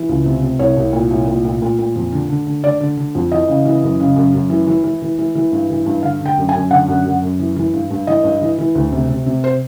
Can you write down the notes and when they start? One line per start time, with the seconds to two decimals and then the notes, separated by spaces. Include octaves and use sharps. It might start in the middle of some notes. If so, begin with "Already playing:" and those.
Already playing: E3
0.09 C#2
0.25 C3
0.42 C3
0.59 C2 C#5
0.77 C2
0.93 A#2
1.11 C2
1.28 A#2
1.45 A#2
1.62 A#2
1.79 A#2
1.96 F2
2.12 D3
2.30 D3
2.47 D3
2.64 D3 D5
2.80 D3
2.97 D3
3.15 F2
3.32 E3 D#5
3.48 C#3
3.65 E3
3.83 F#2
4.00 C#3
4.16 F#2
4.34 F#2
4.50 E3
4.67 E3
4.84 E3
5.02 E3
5.19 E3
5.35 E3
5.52 G2
5.70 E3
5.86 G2
6.03 D3 F5
6.21 D3 G5
6.37 F#2
6.49 G#5
6.54 F#2
6.71 D3 F#5
6.88 F#2
7.05 F#2
7.23 F#2
7.39 E3
7.56 E3
7.74 G2
7.91 G2
8.07 E3 D#5
8.24 G2
8.41 E3
8.58 E3
8.75 D2
8.92 C3
9.09 C3
9.26 C3
9.44 C5